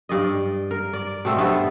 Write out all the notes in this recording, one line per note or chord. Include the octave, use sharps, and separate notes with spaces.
G2 D5 D#5
A#4
D5
B2 A3 C4 A4
G2 A3 B3 E4